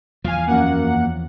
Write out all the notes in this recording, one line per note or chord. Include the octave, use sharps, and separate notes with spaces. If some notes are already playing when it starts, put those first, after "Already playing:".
E2 F3 F5 G#5
F#2 A#3 F#5